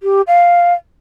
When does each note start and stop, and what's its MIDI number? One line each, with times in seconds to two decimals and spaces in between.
0.03 0.22 67
0.27 0.74 77